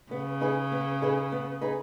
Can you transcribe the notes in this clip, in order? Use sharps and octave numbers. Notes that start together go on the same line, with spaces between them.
C#3 B3
D#4 G#4 B4
B3
D#4 G#4 B4
B3
D#4 G#4 B4